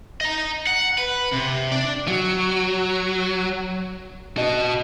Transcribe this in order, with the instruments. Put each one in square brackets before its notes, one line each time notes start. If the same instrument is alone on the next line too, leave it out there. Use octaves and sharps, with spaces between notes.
[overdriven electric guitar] D#5 A#5
F#5
B4
C3
D4 D5
[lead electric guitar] F#3
F#4 D#5